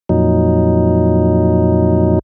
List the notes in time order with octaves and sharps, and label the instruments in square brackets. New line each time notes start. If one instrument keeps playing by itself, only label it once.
[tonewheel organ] F2 A#2 F#3 D#4